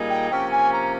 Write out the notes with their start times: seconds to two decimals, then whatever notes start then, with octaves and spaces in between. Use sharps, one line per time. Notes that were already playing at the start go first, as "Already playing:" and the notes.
Already playing: A#2 G3 A#3 D#4 G#4
0.09 G5
0.30 C3 F3 A#3 C#4 G5
0.51 G#5
0.72 A#5